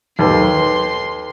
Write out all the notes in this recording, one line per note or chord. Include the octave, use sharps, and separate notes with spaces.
D#2 A4 B4 C6